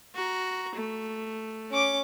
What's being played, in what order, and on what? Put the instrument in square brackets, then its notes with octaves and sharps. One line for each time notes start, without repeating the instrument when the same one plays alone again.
[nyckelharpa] F#4 A#5
A3
[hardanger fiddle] C#4 D6